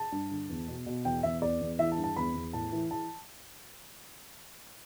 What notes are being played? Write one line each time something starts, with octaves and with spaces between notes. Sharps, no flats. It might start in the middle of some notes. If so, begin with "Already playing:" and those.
Already playing: A5
G2
D3
E2
B2
B2
E2 G5
E2 E5
E2 D5
E2
E3 E5
A5
G2
A5
E2 B5
E2
A2 A5
E3
E3 A5